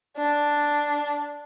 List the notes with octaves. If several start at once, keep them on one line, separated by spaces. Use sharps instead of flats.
D4